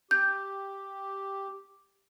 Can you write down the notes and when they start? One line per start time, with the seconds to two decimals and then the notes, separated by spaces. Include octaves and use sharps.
0.11 G4 G6